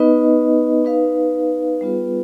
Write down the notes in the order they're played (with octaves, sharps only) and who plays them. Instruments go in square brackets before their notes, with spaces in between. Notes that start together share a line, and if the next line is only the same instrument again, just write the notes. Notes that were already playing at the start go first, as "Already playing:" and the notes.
Already playing: [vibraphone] B3 D#4 B4 D#5
D#4 B4 F5
G3 B3 F4 G#4 B4